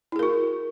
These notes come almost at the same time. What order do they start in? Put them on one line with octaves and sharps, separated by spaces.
E4 G#4 A#4 F#4